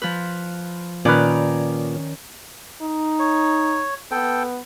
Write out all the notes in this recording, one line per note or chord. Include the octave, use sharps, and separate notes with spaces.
F3 B4
A#2 D#3 C#4 B4 D5
D#4
C#5
B3 A4 G5